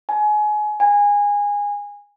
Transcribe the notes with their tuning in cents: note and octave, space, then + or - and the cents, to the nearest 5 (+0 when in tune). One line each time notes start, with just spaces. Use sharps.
G#5 +25
G#5 -20